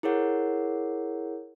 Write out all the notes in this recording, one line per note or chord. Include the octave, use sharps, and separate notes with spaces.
E4 G#4 A#4 C#5 F#5